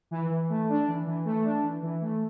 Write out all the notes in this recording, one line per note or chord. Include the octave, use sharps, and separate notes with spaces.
E3
E3
A3
D4
E3
E3
A3
D4
E3
E3
A3